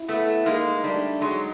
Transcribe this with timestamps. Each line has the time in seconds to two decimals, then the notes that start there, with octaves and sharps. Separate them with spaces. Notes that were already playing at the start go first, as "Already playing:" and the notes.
Already playing: E4
0.08 A3 B3
0.46 G#3 A#3 D#4
0.84 G3 A3 D4
1.21 F#3 G#3 D#4